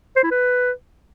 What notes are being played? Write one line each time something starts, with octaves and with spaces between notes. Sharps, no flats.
C5
E4
B4